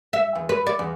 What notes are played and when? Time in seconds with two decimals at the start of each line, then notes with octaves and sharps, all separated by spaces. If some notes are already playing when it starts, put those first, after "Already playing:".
0.13 E5
0.35 E2
0.49 B4
0.66 D5
0.79 E2